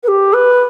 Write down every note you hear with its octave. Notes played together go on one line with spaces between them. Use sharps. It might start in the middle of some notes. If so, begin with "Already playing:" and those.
B4
G4
B4